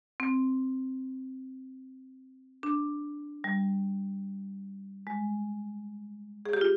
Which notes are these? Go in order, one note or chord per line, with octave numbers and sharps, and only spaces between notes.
C4
D4
G3
G#3
G#4
G4
F4